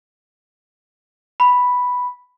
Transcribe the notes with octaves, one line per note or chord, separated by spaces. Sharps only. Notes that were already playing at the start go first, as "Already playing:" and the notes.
B5